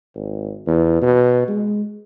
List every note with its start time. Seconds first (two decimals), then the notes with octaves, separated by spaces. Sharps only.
0.15 G#1
0.67 E2
1.02 B2
1.48 G#3